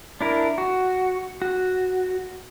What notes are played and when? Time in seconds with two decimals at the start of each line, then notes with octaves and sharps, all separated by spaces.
0.21 D4 E4 A#4
0.58 F#4
1.42 F#4